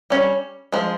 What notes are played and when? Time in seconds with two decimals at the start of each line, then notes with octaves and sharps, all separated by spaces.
0.10 G3 C#4
0.72 F3 G#3